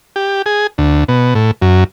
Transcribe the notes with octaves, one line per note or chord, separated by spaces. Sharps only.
G4
G#4
D2
B2
A2
F#2